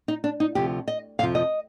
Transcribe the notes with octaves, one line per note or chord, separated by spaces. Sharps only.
D#4
D4
D#4
D2 C3 F3 G4
D#5
F2 C3 F3 F5
D#5